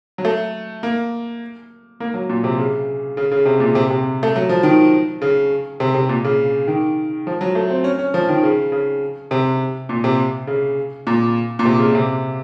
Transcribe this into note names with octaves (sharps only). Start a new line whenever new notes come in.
F#3
A3
A#3
A#3
F#3
A#2
C3
C#3
C#3
C#3
C3
A#2
C3
C3
A3
F#3
F3
D#3
C#3
C3
C3
A#2
C#3
D#3
F3
F#3
A3
C4
C#4
C#4
F3
D#3
C#3
C#3
C3
A#2
C3
C#3
A#2
A#2
C3
C#3
A#2
C3